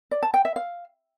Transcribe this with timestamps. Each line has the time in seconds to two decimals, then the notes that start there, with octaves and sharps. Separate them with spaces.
0.11 D5
0.23 A5
0.34 G5
0.45 E5
0.56 F5